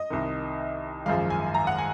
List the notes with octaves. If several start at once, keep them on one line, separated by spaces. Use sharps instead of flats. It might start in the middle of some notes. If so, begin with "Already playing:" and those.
Already playing: D#5
C2 C3 D#3
G#1 F#2 F3 G#3 F5
G#5
A#5
F#5
G#5